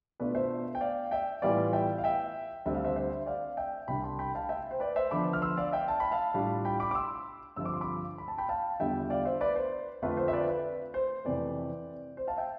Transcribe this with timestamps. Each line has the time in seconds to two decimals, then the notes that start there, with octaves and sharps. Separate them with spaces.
0.20 B2 A3 D4 F4 B4 D5
0.35 C5 E5
0.75 G5
0.81 D5 F5
1.11 E5 G5
1.42 A2 E3 G3 B3 F4 D5 F5
1.73 E5 G5
1.98 F5
2.04 E5 G5
2.66 D2 D3 G3 C4 E5
2.75 F5
2.84 C5 E5
2.96 C5 E5
3.26 D5 F5
3.57 E5 G5
3.88 C2 C3 G3 D4 G5 B5
4.04 A5 C6
4.19 G5 B5
4.35 F5 A5
4.49 E5 G5
4.71 C5
4.80 B4 D5
4.96 C5 E5
5.11 D3 F3 B3 D4 B5 D6
5.33 F6
5.42 C6 E6
5.57 D5 F5
5.72 E5 G5
5.88 A5
6.00 B5
6.11 F5 A5
6.34 A2 G3 D4 F4
6.65 G5 B5
6.80 B5 D6
6.91 D6
6.95 C6 E6
7.56 G2 D3 F3 C4 F4 E6
7.65 D6
7.74 C6
7.81 B5 D6
8.18 B5
8.28 A5
8.38 G5 B5
8.49 F5 A5
8.80 E2 D3 G3 D4 F4 E5 G5
9.10 D5 F5
9.25 C5 E5
9.41 B4 D5
9.56 C5
10.02 F2 D3 A3 D4 F4 B4
10.17 C5
10.28 E5
10.32 B4 D5
10.49 B4
10.94 C5
11.25 F2 C3 E3 A3 B4 D5
12.17 C5
12.27 F5 A5
12.37 E5 G5